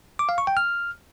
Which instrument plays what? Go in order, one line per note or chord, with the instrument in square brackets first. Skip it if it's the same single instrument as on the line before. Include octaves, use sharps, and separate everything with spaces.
[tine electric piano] D6
F5
C#6
G5
F6